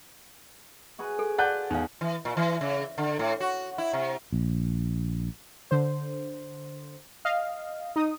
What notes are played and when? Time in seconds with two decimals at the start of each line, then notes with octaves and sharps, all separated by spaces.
0.99 F#4 G#4 B4
1.19 A4
1.39 F4 D5 F#5 A5 F#6 G6
1.70 E2 D#4 F5
2.01 E3
2.25 A#2
2.37 E3
2.61 C#3
2.98 D3
3.19 A2
3.40 F#4
3.78 E4
3.93 C3
4.33 A#1
5.71 D3 C5
7.25 D#5 F5
7.96 D#4 D#6